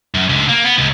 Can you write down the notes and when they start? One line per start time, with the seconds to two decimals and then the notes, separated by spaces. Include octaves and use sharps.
0.15 F#2
0.29 C#2 D3
0.49 A#3
0.64 B3
0.78 C#2